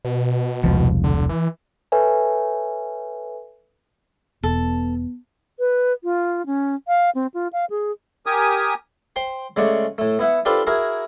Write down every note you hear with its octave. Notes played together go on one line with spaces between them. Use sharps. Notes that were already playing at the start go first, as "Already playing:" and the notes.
B2
E1 C2 F3
D3
E3
A4 B4 C#5 E5 G#5
E1 B3 A4
B4
F4
C#4
F5
C4
F4
F5
G#4
G4 A#4 G#5 D#6
C5 G5 C6
C#3 G#3 A3 D5 F#5 C#6
A2 A3
B3 E4 E5 F#5
D4 F4 G4 A4 B4 C5
E4 F#4 G#4 A#4